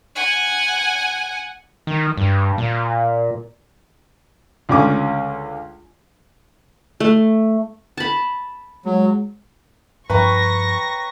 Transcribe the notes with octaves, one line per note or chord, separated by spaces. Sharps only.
F#5 G#5
D#3
G2
A#2
C#2 D3 C#4 D6
A3
A5 B5
F#3 G#3
G2 F3 B4 C#5 G5 A#5 C#6 A#6